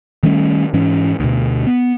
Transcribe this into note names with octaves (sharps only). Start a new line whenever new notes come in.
D#3 G3 A3 C#4
G#2 E3 C#4
D2 B2
B3